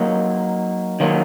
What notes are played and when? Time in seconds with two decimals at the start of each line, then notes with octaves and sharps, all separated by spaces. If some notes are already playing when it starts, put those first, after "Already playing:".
Already playing: F#3 A#3 D#4
1.00 D#3 F#3 A#3